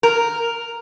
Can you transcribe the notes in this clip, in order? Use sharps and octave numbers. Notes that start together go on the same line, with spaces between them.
A#4